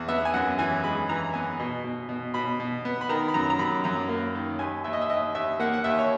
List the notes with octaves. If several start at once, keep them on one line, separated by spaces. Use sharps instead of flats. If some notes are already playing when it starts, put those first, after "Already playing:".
Already playing: E2
B3 E5
G#5
F#2 F#5
E3 G#5
G#3 B5
E3 A#5
B3 G#5
B2
B2
B2
B2 B5
B2
B3
B5
D#3 A#5
B5
F#2 A#5
A#5
F#2 B5
F#2 A#5
A#3
D#3
D#2 G#5
D#2 E5
D#5
E5
D#2 D#5
D#2 E5
A#3 F#5
F#5
D#2 E5
C#5